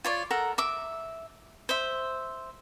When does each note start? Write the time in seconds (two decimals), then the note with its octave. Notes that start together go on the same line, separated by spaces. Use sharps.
0.05 F4 C#5 D5
0.31 A4 A#4 F#5 A#5
0.58 E5 D6
1.69 C5 E5